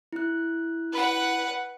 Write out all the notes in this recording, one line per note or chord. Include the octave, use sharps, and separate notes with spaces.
E4 F#6
B4 F#5